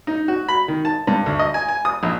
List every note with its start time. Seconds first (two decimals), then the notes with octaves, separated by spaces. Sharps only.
0.07 D#4
0.28 F#4
0.48 B5
0.68 D#3
0.85 A5
1.07 G2
1.26 D2
1.39 D#5
1.54 G#5
1.68 G#5
1.85 D#6
2.03 A#1